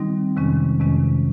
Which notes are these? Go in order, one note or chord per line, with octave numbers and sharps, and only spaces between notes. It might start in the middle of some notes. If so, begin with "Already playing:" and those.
Already playing: D#3 G3 C4 D#4
F2 C3 D#3 G#3 C#4
F2 C3 D#3 G#3 C#4